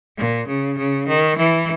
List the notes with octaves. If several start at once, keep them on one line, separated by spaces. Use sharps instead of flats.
A#2
C#3
C#3
D#3
E3